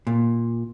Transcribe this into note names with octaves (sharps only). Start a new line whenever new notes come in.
A#2